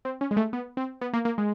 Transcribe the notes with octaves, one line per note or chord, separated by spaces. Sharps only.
C4
C#4
G#3
A3
B3
C4
B3
A#3
A#3
G#3